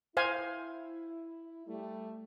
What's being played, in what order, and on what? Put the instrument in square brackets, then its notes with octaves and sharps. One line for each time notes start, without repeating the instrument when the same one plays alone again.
[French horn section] E4 [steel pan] C5 F5 G#5
[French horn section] G3 A3